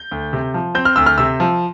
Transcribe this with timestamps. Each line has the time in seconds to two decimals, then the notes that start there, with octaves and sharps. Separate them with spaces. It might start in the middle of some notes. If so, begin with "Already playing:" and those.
Already playing: G6
0.11 D2
0.33 C3
0.54 F3
0.75 C4 G6
0.85 F6
0.96 D2 E6
1.06 F6
1.18 C3 E6
1.40 F3